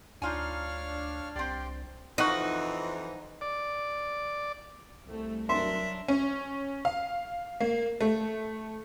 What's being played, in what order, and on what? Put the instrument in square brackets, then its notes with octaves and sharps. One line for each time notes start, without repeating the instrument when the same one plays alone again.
[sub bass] D2 [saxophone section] D4 [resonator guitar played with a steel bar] D#4 F4 G#5 [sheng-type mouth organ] C#5 F5 F6
[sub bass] C2 [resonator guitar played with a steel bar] C4 D5 [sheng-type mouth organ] G4 G5 C6
[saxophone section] F2 E3 [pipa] F3 F#4 [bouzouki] D#4
[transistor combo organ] D5
[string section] C2 A3
[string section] F#3 D4 A#4 [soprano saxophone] E5 [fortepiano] C6
[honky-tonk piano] C#4
F5
A#3
A3